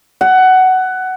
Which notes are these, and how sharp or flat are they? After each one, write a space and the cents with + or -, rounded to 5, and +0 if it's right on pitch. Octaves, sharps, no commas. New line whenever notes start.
F#5 +15